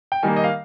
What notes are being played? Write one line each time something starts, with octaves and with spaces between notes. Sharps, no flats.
G5
D#3 G3 A#3 G#5
D#5
F5